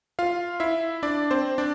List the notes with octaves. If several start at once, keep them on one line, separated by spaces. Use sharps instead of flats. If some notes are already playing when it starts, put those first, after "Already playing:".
F4 F5
E4 E5
D4 D5
C4 C5
D4 D5